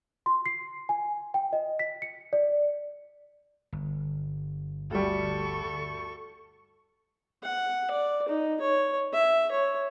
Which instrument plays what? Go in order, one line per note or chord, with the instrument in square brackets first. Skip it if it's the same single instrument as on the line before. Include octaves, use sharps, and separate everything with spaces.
[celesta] C6
C7
G#5
G5
D#5
B6
C#7
D5
[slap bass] G1
[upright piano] D2 G3 [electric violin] A4 C#6
[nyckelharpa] F#5
D5
D#4
C#5
E5
C#5